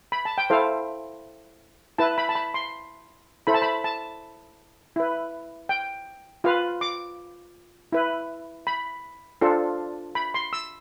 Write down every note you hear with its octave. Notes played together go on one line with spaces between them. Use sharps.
B5
A5
G5
E4 A4 C5 F5
E4 B4 A5
B5
A5
B5
C6
E4 A4 C5 B5
A5
B5
A5
E4 B4
G5
F4 B4 F5
D6
E4 B4
B5
D4 F4 A4 C5
B5
C6
E6